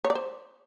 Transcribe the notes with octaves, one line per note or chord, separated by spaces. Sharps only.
C#5
D5
C5